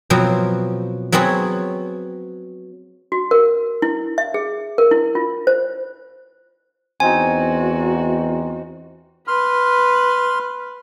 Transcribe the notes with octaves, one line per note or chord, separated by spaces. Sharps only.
B2 F3 F#3 C4
F#3 B3 C4 G#4 C#5
F#4
A#4
E4
E5
G#4
A#4
E4
F4
C5
E2 C4 D#4 F#4 G#5
B4 C6 F6